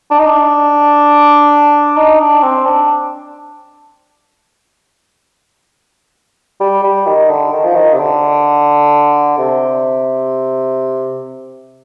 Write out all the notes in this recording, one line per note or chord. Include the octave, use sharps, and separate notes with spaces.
D4
D#4
D4
D#4
D4
C4
D4
G3
G3
D#3
D3
D#3
F3
D#3
C3
D3
C3